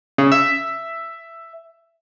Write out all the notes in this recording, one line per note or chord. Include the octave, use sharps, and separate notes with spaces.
C#3
E5